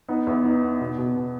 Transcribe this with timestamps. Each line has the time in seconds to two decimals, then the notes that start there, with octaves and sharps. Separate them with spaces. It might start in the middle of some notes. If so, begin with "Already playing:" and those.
0.09 B3 D#4
0.27 E2
0.44 B3 D#4
0.62 B3
0.80 B2
0.98 B2
1.16 B2